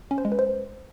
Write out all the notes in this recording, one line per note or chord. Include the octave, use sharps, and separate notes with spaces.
C#4
C5
G#3
B4
C5